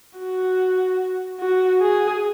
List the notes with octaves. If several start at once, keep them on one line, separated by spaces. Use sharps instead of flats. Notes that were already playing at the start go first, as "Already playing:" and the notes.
F#4
F#4
G#4